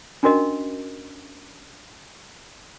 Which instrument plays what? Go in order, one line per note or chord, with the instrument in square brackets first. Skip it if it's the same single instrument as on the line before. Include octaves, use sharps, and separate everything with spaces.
[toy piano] C#4 D4 F#4 A#4 D#5